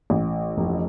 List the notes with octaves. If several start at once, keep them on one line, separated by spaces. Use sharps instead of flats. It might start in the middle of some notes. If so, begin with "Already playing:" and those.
A1
F1